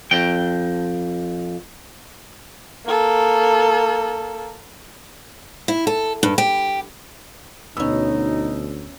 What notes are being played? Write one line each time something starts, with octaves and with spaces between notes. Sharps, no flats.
F2 G5
A#3 A4
E4
A4
G2
G4
D2 B2 B3 C#4 D#4 E6